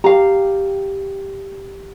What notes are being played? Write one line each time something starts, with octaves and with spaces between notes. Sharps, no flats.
G4 F5 A#5